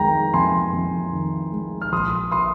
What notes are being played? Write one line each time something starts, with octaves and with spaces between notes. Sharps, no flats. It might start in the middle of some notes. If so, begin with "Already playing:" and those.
Already playing: F2 D#3 G#3 G5 A#5
F2 G#5 C6
F2
D#3
G#3
F6
A#1 C6 D#6
C6 D#6